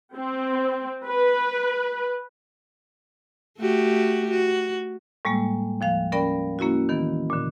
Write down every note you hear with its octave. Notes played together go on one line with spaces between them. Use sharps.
C4
B4
A3 F#4 G4
F#4
A2 G3 G#3 A#3
D#2 F3 F5
C#4 A#4 D5 G5 B5
A#3 C#4 E4 F#4
D#3 E3 B3
A#2 D3